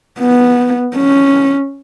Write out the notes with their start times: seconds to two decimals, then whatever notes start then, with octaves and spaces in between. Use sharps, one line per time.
0.19 B3
0.96 C#4